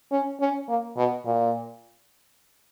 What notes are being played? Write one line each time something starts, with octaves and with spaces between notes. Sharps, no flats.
C#4
C#4
A#3
B2
A#2